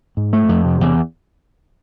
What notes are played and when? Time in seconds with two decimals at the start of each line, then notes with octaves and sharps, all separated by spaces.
0.17 G#2
0.33 A3
0.49 F2
0.65 C3
0.81 E2